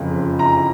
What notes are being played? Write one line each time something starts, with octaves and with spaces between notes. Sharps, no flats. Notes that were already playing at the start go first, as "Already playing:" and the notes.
Already playing: F#1 F2 C#3 F3
A#5